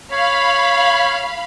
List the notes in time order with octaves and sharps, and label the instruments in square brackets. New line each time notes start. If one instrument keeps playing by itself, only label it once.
[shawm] C#5 [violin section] F5 B5